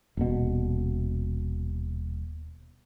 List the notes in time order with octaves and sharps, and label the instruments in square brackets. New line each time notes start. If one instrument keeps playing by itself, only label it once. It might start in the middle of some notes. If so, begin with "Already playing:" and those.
[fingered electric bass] D#1 B2